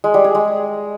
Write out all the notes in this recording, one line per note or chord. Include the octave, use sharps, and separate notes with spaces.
G#3
G3
G#4
G#3